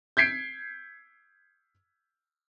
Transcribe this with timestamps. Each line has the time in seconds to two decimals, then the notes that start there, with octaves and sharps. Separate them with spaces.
0.17 G6 G#6 B6 C7 D7